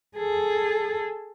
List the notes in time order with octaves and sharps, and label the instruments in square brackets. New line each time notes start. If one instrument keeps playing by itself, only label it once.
[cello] G#4 A4